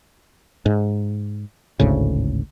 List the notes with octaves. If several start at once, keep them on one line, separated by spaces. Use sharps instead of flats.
G#2
G#1 D2 A2 C#3